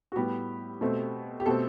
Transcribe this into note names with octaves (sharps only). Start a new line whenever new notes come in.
F#4
A2 G3 B3 G4
B2 A3 C4
G4
B2 A3 C4 A4